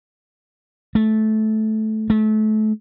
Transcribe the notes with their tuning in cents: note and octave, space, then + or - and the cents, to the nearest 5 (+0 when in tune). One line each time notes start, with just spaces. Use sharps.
A3 -15
A3 -30